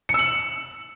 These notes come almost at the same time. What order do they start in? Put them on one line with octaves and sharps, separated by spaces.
C#7 E6 F#7